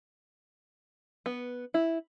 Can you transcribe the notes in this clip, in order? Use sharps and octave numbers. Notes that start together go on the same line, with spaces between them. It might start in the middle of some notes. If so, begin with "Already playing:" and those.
B3
E4